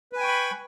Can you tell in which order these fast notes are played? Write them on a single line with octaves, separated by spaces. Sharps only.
B4 G#5 G5 C#6 B5